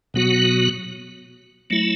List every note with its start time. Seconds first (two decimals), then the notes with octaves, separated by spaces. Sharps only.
0.14 B2 F#3 B3 F#4
1.70 F#3 A3 E4